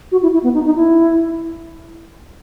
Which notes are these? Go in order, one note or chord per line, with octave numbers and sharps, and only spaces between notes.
F#4
E4
E4
B3
D#4
D#4
E4